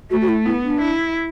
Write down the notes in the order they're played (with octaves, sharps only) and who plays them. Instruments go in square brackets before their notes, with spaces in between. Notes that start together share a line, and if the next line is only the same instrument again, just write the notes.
[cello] A3 [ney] F#4
[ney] F#4
E4
[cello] B3 [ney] E4
[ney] D4
[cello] E4